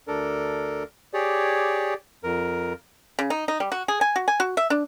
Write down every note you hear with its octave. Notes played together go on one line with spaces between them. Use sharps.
D2 D4 A4 A#4
G4 G#4 C#5 D5
F2 A#4
C#3
D#4
D#4
G3
F#4
G#4
G#5
F#4
G#5
F#4
E5
D4